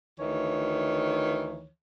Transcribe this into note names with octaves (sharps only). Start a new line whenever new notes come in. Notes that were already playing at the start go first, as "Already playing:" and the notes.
D2 D#3 E3 C#5